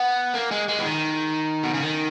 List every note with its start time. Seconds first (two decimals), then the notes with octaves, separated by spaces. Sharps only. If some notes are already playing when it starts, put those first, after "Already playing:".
Already playing: B3
0.35 A#3
0.51 G#3
0.68 G#3
0.78 E3
0.84 D#3
1.64 B2
1.74 C#3
1.83 D#3